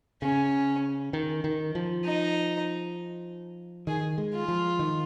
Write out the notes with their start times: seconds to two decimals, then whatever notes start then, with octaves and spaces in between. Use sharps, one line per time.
0.22 C#3 C#4
1.13 D#3
1.44 D#3
1.75 F3
2.05 D#4
3.87 D#3 G#4
4.18 G#3
4.34 F4
4.48 F3
4.79 D#3